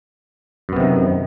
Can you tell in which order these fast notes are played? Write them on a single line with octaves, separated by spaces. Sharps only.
F#2 B3 C3 D#3